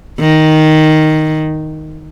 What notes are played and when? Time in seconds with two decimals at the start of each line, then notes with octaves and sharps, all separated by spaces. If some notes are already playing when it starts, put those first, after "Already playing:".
0.19 D#3